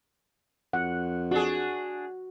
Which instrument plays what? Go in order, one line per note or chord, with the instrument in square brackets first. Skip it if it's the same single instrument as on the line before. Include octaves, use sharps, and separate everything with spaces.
[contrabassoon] F2 [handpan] F#5
[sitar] D4 G#4 [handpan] F#4